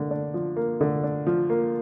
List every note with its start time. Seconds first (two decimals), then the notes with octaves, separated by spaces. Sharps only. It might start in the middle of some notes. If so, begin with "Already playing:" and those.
Already playing: D3 A#3
0.11 D4
0.34 F3
0.57 A#3
0.81 D3
1.04 D4
1.27 F3
1.50 A#3